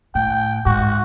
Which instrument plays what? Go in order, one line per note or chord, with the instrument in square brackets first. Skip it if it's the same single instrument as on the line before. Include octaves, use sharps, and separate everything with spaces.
[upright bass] A2 [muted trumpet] G5
[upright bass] G#2 [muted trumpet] F#4